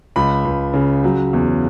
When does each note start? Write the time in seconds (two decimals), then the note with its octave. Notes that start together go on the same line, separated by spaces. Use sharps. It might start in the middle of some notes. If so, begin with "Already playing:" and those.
0.16 C#2 B5
0.45 C#2
0.74 C#3
1.04 F#3
1.33 E2